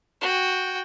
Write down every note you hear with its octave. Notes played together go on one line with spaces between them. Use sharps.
F#4 G5